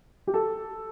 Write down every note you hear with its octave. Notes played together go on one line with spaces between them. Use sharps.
G4
A4